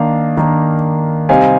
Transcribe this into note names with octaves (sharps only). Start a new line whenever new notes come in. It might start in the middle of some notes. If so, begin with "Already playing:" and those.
Already playing: D#3 A#3 D4 F5
D#3 A#3 D4
C3 G3 C4 D#4 F5 G#5